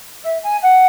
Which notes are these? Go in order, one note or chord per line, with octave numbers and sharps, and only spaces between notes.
E5
G#5
F#5